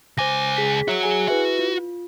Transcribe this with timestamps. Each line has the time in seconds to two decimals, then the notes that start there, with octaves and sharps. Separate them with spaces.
0.18 C#2 C5 G#5 D6 A#6
0.57 G#4 B6
0.88 F#4 C#5 E5 C#7
1.03 G#4 G#5
1.28 E4 F#4 B4 E5
1.59 F4